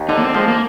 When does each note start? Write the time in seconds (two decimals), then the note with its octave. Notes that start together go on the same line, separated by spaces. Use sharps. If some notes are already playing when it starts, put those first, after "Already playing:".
Already playing: D#2
0.09 D3 D#4
0.17 A#3
0.22 C4
0.34 F3 G#3
0.48 A#3